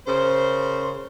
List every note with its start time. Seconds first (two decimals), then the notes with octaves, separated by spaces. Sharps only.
0.07 C#3 A#4 C5